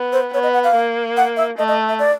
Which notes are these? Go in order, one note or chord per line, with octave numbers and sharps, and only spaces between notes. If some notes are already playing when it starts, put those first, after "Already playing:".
Already playing: B3
C5
B3 C#5
D#5
F#5
F5
A#3
F#5
E5
A3 D#5
D#5
E5
D5